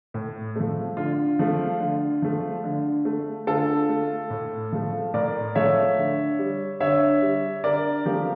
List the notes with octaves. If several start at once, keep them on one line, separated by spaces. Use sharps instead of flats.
A2
F3 A3
D3 F4
F3 A3
D3
F3 A3
D3
A3
D3 F4 A4
A3
A2
F3 A3
A2 A#4 D5
F3 A3 C#5 E5
D3
G3
D3 C#5 E5
G3
D3 A#4 D5
F3 A3 G4 A#4